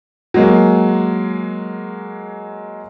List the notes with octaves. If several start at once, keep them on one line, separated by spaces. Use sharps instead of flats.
F#3 G#3 A#3